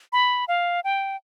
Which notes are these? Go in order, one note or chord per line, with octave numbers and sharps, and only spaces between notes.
B5
F5
G5